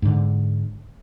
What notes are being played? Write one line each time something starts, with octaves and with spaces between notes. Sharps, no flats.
G#2 D3